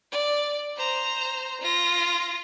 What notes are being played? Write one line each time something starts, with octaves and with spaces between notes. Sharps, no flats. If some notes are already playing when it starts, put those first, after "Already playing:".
D5
C5 A#5
F4 A#6